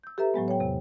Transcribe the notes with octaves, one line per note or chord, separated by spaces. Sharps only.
E6 G6
G4 A4 B4 E5 A#5
A2 F#3 G#3 B3
C#5 G5
E2 C3